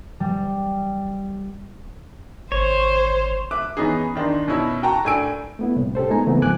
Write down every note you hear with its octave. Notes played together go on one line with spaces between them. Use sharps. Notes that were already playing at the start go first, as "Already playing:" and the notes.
G3
G#1 C5 C#5
E5 D6 F#6
E3 B3 C#4 D#4 G#4
D#3 D4 D#4 C6
B2 C#4 D#4 E4
F#4 G5 A5 A#5 C#6
A2 D4 G#5 E6 D7
A3 B3 E4
C2 A2
C#4 G4 A4 C5
G#3 A3 B3 D#4 G#5 A#5
C2 C#3 E3 A3 B3 C4
C#2 G#2 F3 G#5 D6 F#6